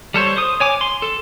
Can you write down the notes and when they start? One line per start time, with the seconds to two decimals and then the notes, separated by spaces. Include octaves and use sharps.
0.14 G3 A4 C5 C#5
0.37 C5 D#6
0.60 C#5 G#5 D6
0.81 C6
1.02 A4